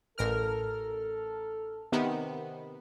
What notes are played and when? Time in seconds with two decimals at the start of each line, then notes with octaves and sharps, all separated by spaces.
0.18 A1 A4 A#4 F6
1.92 C3 D#3 B3